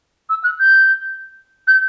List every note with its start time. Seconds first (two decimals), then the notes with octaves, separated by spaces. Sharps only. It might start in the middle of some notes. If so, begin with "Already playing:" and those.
0.29 E6
0.44 F#6
0.60 G6
1.67 G6